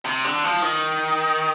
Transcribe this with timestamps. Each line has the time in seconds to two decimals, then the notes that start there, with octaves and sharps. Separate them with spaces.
0.06 C3
0.24 D3
0.44 F3
0.62 D#3